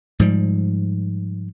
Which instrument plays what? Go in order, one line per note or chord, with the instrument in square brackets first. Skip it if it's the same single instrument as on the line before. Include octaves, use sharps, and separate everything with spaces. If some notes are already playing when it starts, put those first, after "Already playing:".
[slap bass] G#2 F3 G3